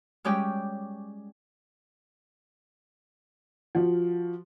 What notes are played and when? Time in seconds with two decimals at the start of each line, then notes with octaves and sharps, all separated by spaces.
0.24 G3 G#3 C#4 G4 D5 G5
3.75 F3 F#4